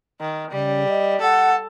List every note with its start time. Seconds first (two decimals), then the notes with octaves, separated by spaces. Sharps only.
0.20 D#3
0.51 C#3 G3
0.88 D#5
1.21 A4 F#5